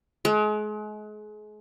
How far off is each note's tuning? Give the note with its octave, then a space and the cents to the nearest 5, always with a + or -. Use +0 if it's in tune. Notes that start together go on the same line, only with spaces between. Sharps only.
G#3 +35